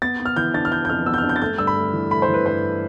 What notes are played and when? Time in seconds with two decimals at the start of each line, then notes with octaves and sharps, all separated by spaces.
0.02 B3 A6
0.20 B3
0.25 F6
0.36 E3 G6
0.54 D4 A6
0.65 F6
0.72 D4 G6
0.85 G6
0.89 F2 F6
1.06 B3 E6
1.14 G6
1.18 F6
1.23 D4
1.29 G6
1.36 A6
1.41 A3 G6
1.58 G2 E6
1.67 B5
1.76 A3
1.93 E3
2.11 A3 B5
2.22 C5
2.28 E3
2.34 B4
2.46 G2 C5